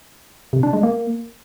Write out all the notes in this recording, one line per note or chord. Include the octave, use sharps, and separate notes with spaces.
C3
D4
G#3
A#3